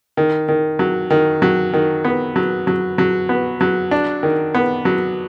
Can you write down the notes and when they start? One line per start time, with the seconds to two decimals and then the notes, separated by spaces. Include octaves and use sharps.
0.17 D#3
0.48 D#3
0.79 F#3
1.10 D#3
1.42 F#3
1.73 D#3
2.04 B3
2.36 F#3
2.67 F#3
2.98 F#3
3.29 B3
3.61 F#3
3.91 D4
4.23 D#3
4.55 B3
4.85 F#3